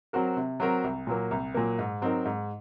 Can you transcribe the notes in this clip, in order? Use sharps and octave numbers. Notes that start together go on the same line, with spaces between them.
F#3 C4 F#4 A#4
C3
F#3 C4 F#4 A#4
C2
A#2 F#3 A#3
C2
A#2 F#3 A#3
G#2
F#3 C4 D#4 A#4
G#2